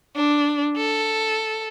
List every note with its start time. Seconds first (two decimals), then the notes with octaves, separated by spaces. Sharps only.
0.16 D4
0.77 A4